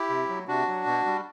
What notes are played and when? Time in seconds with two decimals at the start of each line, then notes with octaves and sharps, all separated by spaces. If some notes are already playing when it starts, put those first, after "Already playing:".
Already playing: E4 G4
0.10 C3
0.29 F#3
0.48 C3 D4 F#4
0.68 F#3
0.86 B2
1.06 G3